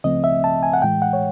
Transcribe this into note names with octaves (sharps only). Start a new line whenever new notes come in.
C#2 C#3 F3 A3 C4 D#5
E5
A5
G#5
F#5
A2 E3 G#3 G5
F#5
C#5